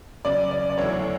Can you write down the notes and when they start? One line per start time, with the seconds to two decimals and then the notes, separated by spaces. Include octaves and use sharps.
0.25 C#3 F#3 C#4 D5
0.51 D5
0.70 D5
0.78 E2 D3 F#3 A3 E4 C#5